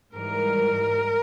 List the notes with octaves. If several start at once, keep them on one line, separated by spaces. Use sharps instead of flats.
G#2 E3 G3 A#4